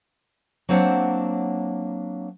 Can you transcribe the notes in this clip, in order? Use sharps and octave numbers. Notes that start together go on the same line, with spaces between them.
F#3 A#3 C4 D4 C#5 F#5